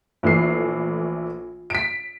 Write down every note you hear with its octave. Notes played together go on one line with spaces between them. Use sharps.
A#1 E3 A3 C7
B6 D7